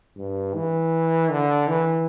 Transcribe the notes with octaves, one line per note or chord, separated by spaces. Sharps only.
G2
E3
D3
E3